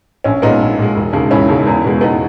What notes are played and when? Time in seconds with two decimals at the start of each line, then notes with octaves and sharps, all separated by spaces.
0.24 A#1 C#4
0.42 A#2 G#3 B3 D#4
0.60 A#1
0.78 A#2 G#3
0.96 E1
1.13 D#2 C#3 G#3
1.31 E1 C#4 E4
1.49 D#2 C#3 G#3
1.67 E2
1.84 B2 G#3
2.01 E2 B3 D#4